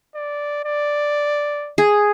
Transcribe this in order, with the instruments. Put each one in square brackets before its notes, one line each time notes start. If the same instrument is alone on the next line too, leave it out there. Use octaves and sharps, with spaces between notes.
[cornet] D5
D5
[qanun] G#4